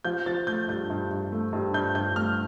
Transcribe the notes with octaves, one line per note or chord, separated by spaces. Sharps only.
F3 G6
F3 A6
A3 G6
G2 G6
G2
G2
A3
G2
G2 G6
G2 G6
A3 F6